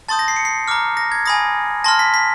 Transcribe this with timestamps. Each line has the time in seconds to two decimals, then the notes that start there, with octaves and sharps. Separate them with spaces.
0.08 A5 C6 D#6 G6 A6
0.19 A#6
0.28 C7
0.36 C#7
0.45 C7
0.68 A#5 D6 F6
0.97 A#6
1.12 G#6
1.26 G#5 B5 D#6 A#6
1.84 A5 C6 F6 A#6
1.99 B6
2.14 B6